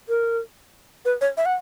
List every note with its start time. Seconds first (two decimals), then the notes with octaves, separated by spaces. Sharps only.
0.09 A#4
1.05 B4
1.21 C#5
1.37 E5
1.46 F#5